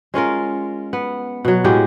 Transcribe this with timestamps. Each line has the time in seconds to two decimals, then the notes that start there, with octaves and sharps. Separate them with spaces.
0.14 G#3 C#4 F4 A#4
0.93 B3
1.45 B2 F#3
1.64 A2 G#3 F#4 G4